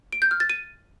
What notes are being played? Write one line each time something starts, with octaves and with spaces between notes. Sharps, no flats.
D7
G6
F6
A6
D#7